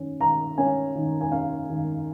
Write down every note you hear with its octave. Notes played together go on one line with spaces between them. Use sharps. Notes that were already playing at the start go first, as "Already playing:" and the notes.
Already playing: D#3 C#4
D#3 A#5
C#4 G#5
D#3
G#5
C#4 F5
D#3